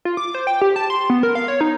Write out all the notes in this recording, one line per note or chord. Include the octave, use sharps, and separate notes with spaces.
F4
D6
C5
G5
G4
A5
C6
B3
A#4
F5
C#5
D#4